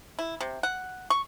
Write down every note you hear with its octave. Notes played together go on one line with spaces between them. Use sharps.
E4
C3
F#5
C#6